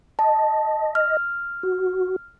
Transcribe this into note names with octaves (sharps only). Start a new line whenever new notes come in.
D#5 A5
F6
F#4